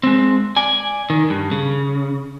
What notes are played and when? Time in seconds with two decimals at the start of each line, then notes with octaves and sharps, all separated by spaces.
0.03 G#3 C4
0.57 D5 G#5
1.10 D#3
1.30 G2
1.52 C#3